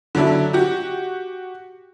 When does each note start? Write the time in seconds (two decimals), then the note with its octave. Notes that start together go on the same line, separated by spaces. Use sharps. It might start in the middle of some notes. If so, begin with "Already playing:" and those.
0.15 D3 F#3 D4 E4
0.53 F#4 G4